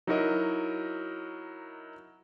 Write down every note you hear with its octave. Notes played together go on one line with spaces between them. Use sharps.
F#3 D#4 E4 F#4 A#4 D#5